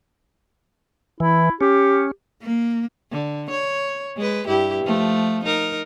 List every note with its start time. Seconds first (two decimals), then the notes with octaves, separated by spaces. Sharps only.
1.20 E3 E4
1.61 C#4 G4
2.43 A#3
3.11 D3
3.50 C#5
4.17 G#3 B4
4.47 G2 E4 G4
4.84 F3 A3
5.45 D#4 A#4